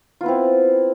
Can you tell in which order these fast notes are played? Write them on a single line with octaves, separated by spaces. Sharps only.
F4 B3 E4 C4